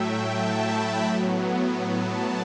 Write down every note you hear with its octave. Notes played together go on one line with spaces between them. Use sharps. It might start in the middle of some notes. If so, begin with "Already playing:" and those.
Already playing: A2 F#3 A3 E5 G5
A5
B5
A2 F#3 B3
A5